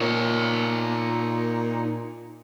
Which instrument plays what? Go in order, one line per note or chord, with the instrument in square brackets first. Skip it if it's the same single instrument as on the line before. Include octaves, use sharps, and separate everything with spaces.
[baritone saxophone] A#2 [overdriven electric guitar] D#4 C#5